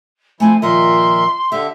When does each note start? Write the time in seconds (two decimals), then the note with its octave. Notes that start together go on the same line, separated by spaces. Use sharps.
0.40 F3 A3 C4 E4 G#5
0.62 A#2 D#3 F3 A#4 D#5 E5 C6
1.52 D3 G4 E5